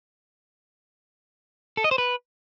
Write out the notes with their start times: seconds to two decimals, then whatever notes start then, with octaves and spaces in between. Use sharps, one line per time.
1.77 A4
1.84 D#5
1.91 C5
1.98 B4